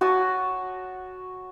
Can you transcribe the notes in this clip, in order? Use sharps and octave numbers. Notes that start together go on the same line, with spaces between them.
F#4 C#5 A5 D#6